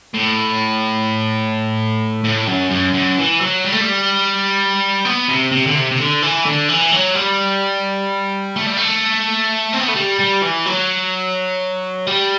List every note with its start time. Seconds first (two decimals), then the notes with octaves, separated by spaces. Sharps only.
0.14 A2
2.24 A2
2.48 F#2
2.71 F#2
2.94 F#2
3.18 E3
3.41 F#3
3.65 G3
3.73 A3
3.82 G3
5.05 B3
5.28 C3
5.52 C3
5.67 D3
5.75 C3
5.91 C3
5.99 D3
6.22 E3
6.46 D3
6.69 E3
6.92 F#3
7.16 G3
8.56 A3
8.67 G3
8.77 A3
9.74 C4
9.80 B3
9.89 A3
9.96 G3
10.20 G3
10.43 E3
10.66 F#3
12.07 G3